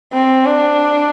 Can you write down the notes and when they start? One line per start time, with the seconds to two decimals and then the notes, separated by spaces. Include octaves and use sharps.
0.13 C4
0.45 D4